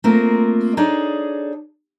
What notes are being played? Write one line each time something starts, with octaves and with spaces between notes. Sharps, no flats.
A3 A#3 C4 F4 A#4
D4 D#4 G#4 A4 C#5 D5